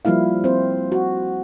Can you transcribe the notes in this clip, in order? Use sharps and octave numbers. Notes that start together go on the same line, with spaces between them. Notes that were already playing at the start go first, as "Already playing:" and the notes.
F3 G3 A#3 E4 F5
C4 C5
F#4